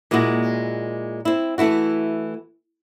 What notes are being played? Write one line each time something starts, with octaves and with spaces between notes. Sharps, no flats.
A#2 G#3 A#3 E4 F#4
C4 E4
E3 A3 E4 F#4